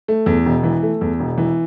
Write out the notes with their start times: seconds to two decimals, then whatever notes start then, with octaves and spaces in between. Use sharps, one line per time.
0.08 A3
0.26 E2
0.45 E1
0.63 E3
0.83 A3
1.01 E2
1.20 E1
1.38 E3